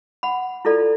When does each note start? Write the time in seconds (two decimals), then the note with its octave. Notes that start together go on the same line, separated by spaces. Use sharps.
0.23 F#5 B5
0.65 E4 F4 A4 D5